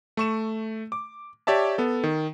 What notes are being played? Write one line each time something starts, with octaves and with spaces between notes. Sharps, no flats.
A3 C#6 E7
D6
G4 C#5 D5 E5 A5
B3 A4
D#3